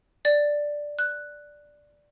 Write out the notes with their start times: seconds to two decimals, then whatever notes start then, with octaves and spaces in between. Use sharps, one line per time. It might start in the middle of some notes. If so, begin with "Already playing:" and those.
0.25 D5
0.99 F#6